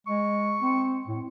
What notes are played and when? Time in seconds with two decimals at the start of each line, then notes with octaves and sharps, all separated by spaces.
0.07 G#3 C#6
0.61 C4
1.07 A2